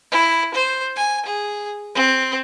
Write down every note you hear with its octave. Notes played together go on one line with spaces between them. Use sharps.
E4
C5
G#5
G#4
C4